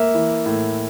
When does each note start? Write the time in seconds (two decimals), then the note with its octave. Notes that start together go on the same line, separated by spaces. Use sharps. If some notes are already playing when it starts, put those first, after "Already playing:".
Already playing: A#3 E5
0.14 E3
0.46 A2